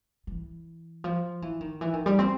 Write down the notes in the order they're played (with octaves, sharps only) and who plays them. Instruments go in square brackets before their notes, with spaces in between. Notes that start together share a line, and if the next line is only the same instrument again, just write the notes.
[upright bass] E3
F3
E3
D#3
E3
D#3
G3
C4